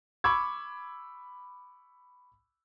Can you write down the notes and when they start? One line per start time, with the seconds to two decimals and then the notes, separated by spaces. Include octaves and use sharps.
0.24 B5 C#6 D6 E6 G#6